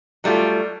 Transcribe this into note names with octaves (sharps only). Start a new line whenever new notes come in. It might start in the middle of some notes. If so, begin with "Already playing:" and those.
F#3 G3 A3 F4